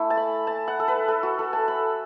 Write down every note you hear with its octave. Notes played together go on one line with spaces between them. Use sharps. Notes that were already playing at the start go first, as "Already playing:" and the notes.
Already playing: A3 E4
A5
B5
A5
F#5
A4
B4
A4
F#4
A4
A5
B5